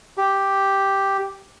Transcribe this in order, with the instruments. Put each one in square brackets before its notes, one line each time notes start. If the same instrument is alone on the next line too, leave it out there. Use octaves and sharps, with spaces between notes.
[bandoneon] G4